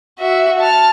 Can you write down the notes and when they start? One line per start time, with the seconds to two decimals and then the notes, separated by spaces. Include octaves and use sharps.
0.19 F#4 E5
0.60 A5 F6